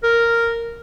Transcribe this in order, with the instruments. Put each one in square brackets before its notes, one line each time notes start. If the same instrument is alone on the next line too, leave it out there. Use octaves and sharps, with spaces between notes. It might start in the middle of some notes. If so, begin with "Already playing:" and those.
[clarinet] A#4